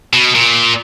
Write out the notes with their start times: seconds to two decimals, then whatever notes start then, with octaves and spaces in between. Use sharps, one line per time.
0.13 B2
0.35 A#2